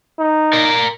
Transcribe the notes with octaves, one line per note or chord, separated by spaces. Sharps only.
D#4
A#4 D5